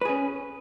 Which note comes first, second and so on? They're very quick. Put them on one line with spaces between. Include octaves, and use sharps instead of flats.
B4 G#4 C#4